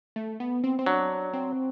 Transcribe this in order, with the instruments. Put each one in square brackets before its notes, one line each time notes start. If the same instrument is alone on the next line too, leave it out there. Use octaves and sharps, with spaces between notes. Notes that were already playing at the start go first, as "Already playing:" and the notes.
[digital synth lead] A3
B3
C4
C4
[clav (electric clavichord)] F#3 [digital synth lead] D4
[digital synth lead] C4